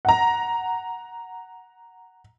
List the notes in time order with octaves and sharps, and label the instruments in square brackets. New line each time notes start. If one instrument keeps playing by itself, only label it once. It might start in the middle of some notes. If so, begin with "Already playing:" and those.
[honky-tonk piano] F#5 A#5